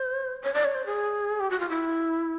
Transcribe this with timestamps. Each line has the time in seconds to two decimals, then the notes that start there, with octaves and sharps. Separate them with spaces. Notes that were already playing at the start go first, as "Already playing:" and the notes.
Already playing: C5
0.44 C#5
0.54 D5
0.65 C#5
0.75 C5
0.86 G#4
1.40 G4
1.50 F#4
1.60 F4
1.69 E4